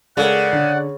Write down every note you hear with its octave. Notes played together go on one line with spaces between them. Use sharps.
C#3 G#3 A4 A#4 D5 F#5
D3